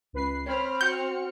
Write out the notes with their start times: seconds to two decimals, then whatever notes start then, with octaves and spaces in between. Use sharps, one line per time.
0.13 C#2 B4 C7
0.46 C4 C#5 B5 F6
0.81 F#4 F6 G6 C#7